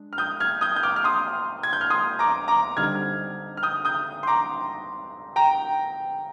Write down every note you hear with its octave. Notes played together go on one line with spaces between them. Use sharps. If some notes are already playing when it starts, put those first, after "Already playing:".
Already playing: G#3 D4
F6
D#6 G6
F6 G#6
D#6 G6
G6
D6 F6
F6
C6 D#6
G#6
G6
F6
C6 D#6
A#5 D6
A#5 D6
D3 G3 C4 D#4 F6 G#6
F6
D#6 G6
D#6 G6
C6
A#5 D6
G5 A#5